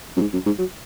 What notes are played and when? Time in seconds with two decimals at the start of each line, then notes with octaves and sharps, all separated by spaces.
0.16 F#2
0.21 G#2
0.33 F#2
0.46 G#2
0.59 F#3